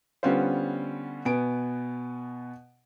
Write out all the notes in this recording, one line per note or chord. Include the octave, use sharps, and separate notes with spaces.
D3 G3 B3 C#4 F4 C5
B2 B3 G#5 D7